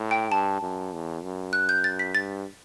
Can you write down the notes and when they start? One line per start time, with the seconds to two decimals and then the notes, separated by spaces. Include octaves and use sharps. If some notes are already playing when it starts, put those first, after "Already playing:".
Already playing: A2
0.11 G5
0.31 G2 A5
0.61 F#2
0.93 E2
1.23 F#2
1.53 F#6
1.69 G6
1.84 A6
1.99 B6
2.14 G2 A6